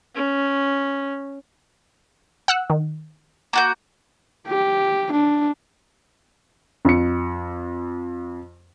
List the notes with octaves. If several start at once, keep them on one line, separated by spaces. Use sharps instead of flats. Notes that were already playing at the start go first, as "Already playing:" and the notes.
C#4
F#5 E6 F#6
D#3
A#3 F#4 G6
G4
D4
F2 C#7